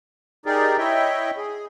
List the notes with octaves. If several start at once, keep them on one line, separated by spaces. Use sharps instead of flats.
D#4 G4 G#4 A#4 D5
E4 C#5 D#5 E5 G5
G#4